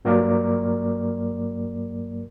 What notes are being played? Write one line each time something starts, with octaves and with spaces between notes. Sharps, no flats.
G2 F#3 A#3 A#4 D5 D6